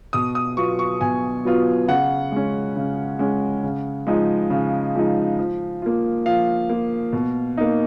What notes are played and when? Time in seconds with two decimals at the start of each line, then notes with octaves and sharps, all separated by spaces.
0.13 B2 D#6
0.35 D#6
0.57 F#3 B3 F4 C#6
0.79 C#6
1.01 B2 G#5
1.45 F#3 B3 F4
1.88 C#3 F#5
2.32 G#3 C#4
2.76 C#3
3.19 G#3 C#4
3.63 C#3
4.07 F3 G#3 D#4
4.50 C#3
4.95 F3 G#3 D#4
5.39 F3
5.82 A#3 F4
6.26 F3 F5
6.70 A#3 F4
7.13 B2
7.57 A#3 D#4